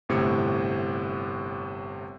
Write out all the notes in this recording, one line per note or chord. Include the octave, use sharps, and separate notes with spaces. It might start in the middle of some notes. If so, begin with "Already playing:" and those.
G1 A2 C3 G#6 C#7